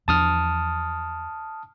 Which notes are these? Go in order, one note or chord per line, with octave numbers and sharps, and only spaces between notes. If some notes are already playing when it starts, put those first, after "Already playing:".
E2 F3 D4 A5 D#6 F6